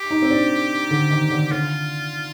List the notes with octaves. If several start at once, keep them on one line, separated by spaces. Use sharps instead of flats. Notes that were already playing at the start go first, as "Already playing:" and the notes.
Already playing: G4
D#4
C4
D4
D3
D#3
D3
D3 F4